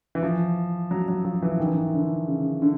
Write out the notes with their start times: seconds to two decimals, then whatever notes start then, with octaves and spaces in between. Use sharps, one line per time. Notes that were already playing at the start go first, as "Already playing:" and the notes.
0.15 E3
0.23 F3
0.91 F#3
1.08 F#3
1.25 F3
1.42 E3
1.60 D#3
1.66 E3
1.74 D#3
1.94 D3
2.27 C#3
2.62 D3